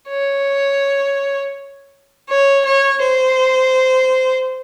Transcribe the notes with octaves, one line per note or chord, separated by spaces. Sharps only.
C#5
C#5
C#5
C5